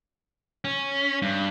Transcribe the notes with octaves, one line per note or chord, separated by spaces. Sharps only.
C#4
G2